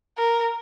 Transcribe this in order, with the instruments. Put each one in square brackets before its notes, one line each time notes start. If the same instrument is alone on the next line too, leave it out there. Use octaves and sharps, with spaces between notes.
[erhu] A#4